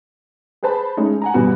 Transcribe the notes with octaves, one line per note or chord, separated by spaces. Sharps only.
G#4 B4 C5 A5 B5
G#3 A3 C#4 D#4
F#5 G#5 A#5
G1 B2 G3 B3 F#4